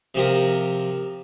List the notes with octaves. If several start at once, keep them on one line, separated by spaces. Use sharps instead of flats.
C3 F3 C4 G4 A#4